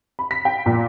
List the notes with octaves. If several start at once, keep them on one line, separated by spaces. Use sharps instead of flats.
B5
B6
G5
A#2